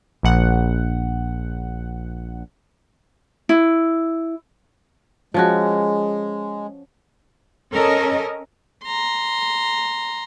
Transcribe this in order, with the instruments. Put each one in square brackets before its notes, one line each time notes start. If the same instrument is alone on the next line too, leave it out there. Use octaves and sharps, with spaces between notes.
[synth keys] A#1 F#5
[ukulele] E4
[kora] F3 C#4 F#4 [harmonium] G#3
[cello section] C#4 A4 A#4 D#5
[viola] A#5 C6